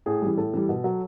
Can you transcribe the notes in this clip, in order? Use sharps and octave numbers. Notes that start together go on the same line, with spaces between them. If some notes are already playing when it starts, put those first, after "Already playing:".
A2 G#4
E3 G3
A2 A4
E3 G3
B2
F#3